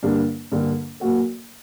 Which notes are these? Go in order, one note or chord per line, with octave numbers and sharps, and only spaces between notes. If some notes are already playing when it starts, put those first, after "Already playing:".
G2 D3 G3 A#3 D4
G2 D3 G3 A#3 D4
A#2 F#3 A#3 F#4 A4